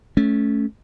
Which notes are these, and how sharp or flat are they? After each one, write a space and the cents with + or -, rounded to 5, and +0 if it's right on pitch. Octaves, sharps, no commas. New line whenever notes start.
A3 -15 C#4 +0